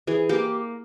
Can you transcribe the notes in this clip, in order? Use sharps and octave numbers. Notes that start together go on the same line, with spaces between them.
E3 G#4
A#3 G4